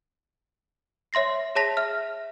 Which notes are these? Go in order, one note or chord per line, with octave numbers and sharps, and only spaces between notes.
C#5 E5 C6 A#6 C7
G#4 C#5 A5 A#6 B6 F7
E5 F6